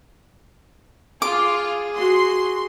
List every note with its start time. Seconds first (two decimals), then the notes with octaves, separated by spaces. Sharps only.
1.22 F4 G#4 D6
1.96 F#4 C6